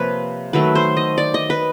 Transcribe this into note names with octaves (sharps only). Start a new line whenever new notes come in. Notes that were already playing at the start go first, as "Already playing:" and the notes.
Already playing: C3 F3 A#3 B4 C#5
D#3 F#3 A3 B4
C5
D#5
D5
D#5
B4